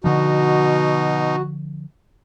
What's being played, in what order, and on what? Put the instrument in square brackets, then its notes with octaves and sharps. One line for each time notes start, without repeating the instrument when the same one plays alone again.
[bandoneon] B2 D#4 [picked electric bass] D3 F3 [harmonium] F#4